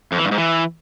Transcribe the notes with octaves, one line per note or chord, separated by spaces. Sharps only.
F2
E3
G2
G#2
E3